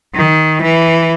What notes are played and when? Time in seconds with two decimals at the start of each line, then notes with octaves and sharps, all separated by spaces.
0.15 D#3
0.61 E3